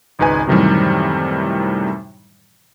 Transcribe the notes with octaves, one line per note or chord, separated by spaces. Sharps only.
G#1 C#2 D#4 B4 G#5
F#2 A2 C3 D#3 E3 G3